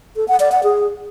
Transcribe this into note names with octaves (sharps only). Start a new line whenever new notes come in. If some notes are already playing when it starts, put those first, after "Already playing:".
A4
F#5
D5
F#5
G#4